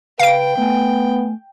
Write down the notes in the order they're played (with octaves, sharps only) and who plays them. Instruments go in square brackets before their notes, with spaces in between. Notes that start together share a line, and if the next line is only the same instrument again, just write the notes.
[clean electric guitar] C#3 [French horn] B4 [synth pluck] F5 D7 [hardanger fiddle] G5
[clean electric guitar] A3 G#5 [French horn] B3